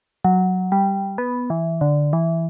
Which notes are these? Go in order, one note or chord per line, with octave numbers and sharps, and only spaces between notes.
F#3
G3
B3
E3
D3
E3